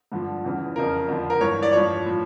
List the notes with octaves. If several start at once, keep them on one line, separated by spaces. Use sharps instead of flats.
G2 D3 F3
E2 C#3 E3
F2 C#3 F3 A#4
F2 D3 F3
A#4
G2 E3 C#5
D5
G2 F3 C#5
A2 F3